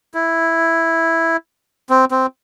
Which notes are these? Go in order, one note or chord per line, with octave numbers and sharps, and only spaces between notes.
E4
C4
C4